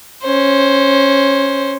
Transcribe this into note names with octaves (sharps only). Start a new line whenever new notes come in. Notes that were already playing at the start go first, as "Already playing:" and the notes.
C#4 C5